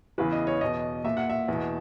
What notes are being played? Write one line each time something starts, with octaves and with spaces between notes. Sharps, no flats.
E2 C#3 E3 B4
D#5
C#5
E2 B2 D#5
A#2 E5
F#5
E5
E2 B2